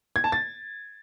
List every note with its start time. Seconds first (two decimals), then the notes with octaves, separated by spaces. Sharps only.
0.16 G#6
0.24 A5
0.32 A6